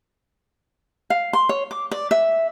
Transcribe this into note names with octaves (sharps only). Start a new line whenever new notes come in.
F5
C6
C#5
D6
D5
E5